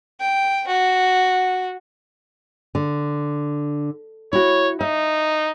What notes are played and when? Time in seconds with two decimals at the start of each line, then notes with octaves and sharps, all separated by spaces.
0.20 G5
0.68 F#4
2.75 D3
4.33 E4 F#4 C#5
4.81 D#4 E5